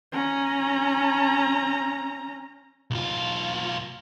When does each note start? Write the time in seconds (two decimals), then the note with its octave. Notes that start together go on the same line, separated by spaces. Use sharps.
0.12 C#4 A#5
2.91 B1 F4